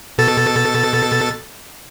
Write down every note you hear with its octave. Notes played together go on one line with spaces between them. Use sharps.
B2 A4 A6